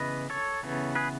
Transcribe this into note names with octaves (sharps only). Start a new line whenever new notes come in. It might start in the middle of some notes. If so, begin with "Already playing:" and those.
Already playing: C#3 E3 B3 B4 D#5
A4 C#5
C#3 E3 B3
G#4 B4